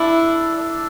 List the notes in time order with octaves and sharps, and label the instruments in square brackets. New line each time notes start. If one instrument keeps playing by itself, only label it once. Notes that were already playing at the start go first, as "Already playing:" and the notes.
Already playing: [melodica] D4 A4 D5 [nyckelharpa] E4
[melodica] D4 A4 D5